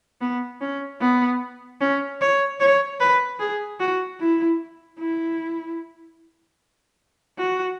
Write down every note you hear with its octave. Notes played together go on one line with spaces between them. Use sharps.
B3
C#4
B3
C#4
C#5
C#5
B4
G#4
F#4
E4
E4
F#4